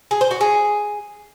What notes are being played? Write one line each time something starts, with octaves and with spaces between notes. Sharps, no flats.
G#4
C5
F#4
G#4